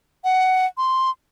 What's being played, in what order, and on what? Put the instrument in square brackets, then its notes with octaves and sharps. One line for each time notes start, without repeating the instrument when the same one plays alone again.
[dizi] F#5
C6